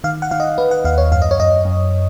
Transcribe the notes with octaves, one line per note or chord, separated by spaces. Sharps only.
D#3 F5
F#5
D#3 F5
D#5
D#3 B4
F#5
D#2 F5
C#5
F#2 F5
D#5
C#5
F#2 D#5
F#2